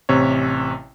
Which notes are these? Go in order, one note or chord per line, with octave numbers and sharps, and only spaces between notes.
A1 C3 C4 C#5